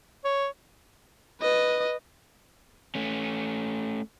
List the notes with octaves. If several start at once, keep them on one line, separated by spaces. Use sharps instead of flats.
C#5
B4 D#5
A3 C#4